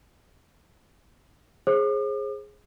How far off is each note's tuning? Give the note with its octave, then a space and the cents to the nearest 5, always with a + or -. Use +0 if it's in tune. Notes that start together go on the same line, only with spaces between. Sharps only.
G#4 +0 C5 +40 D6 +45